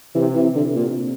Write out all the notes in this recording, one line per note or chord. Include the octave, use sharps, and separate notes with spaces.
C3 E3
E3
C3
D3
A#2